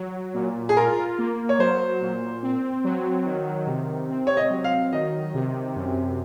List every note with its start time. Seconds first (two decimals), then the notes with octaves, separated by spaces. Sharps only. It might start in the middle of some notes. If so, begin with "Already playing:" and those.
Already playing: F#3
0.34 A#2
0.69 G#4
0.76 F4 A#4
1.18 A#3
1.49 C#5
1.59 F#3 C5
2.01 A#2
2.43 C4
2.84 F#3
3.25 D#3
3.67 C3
4.09 C4
4.27 C#5
4.37 D#5
4.50 F#3
4.64 F5
4.93 D#3 D#5
5.34 C3
5.76 F#2